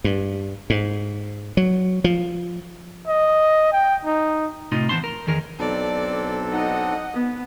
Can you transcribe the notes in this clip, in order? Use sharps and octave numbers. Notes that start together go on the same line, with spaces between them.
G2
G#2
F#3
F3
D#5
G5
D#4
A2 C3 D#4 F4 C6
E3 B3 C5 A5 C6
A#4
E2 D#3 G#4 A#4
B1 C4 D4 A4 D5
D#4 D#5 F#5
B3